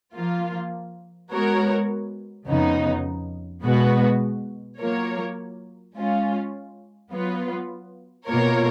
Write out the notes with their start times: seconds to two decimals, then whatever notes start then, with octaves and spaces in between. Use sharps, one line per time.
0.15 F3 A#3 F4
1.31 G#3 B3 F#4 A#4 C#5
2.47 F2 C#3 F3 B3 D#4
3.63 B2 G#3 B3 F#4 B4
4.79 F#3 A#3 F4 A#4 C#5
5.95 G#3 C#4 F4
7.11 F#3 B3 F4 B4
8.27 B2 A#3 F4 A#4 C#5